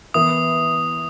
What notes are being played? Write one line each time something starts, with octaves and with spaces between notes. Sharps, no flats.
E3 B3 E4 D#6